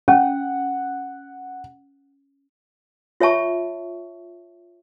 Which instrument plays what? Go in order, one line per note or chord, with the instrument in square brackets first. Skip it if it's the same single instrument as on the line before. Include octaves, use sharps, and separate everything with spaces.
[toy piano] C#4 [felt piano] F#5
[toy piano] F4 C#5 E5 A5 C#6